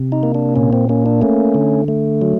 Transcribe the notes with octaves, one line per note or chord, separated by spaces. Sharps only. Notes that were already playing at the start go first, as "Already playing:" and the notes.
Already playing: C3
D#4
A#3
D4
A#2 C#4
C4
A#3 C#4
D4
A3 C#4
D3
A3
F#3